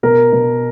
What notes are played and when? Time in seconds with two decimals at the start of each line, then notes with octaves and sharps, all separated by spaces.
0.03 B2 A#4
0.32 B2